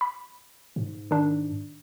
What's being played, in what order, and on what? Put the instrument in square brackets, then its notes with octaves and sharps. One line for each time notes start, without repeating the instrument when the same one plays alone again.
[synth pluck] B5
[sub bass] G#2
[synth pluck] D#3 D4